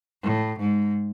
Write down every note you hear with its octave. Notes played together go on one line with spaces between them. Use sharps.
A2
G#2